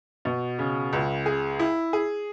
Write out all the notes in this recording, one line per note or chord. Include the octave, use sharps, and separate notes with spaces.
B2
C#3
C#2
G#4
E4
G#4